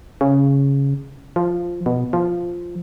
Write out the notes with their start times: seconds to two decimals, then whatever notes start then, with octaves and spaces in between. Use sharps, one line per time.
0.21 C#3
1.36 F3
1.86 B2
2.13 F3